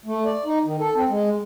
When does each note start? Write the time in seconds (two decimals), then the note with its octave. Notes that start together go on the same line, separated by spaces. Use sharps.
0.06 A3
0.25 D5
0.45 D#4
0.65 D#3
0.79 A4
0.95 C4
1.09 G#3